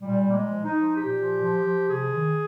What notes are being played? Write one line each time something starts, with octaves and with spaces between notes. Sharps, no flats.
A#2 G3
A#2 A#3
G#3
F3
D#4
F3
A#2 G4
F3
F3
F3
C3 G#4
D#3